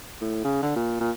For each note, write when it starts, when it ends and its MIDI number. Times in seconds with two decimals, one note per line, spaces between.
0.21 0.43 45
0.44 0.59 49
0.63 0.73 50
0.76 0.97 46
1.00 1.11 46